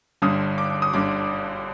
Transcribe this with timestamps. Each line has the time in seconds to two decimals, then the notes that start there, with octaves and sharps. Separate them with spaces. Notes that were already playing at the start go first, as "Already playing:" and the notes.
0.22 G1 G2 D3 D#6
0.58 D6
0.82 D#6
0.93 G1 G2 D3 D6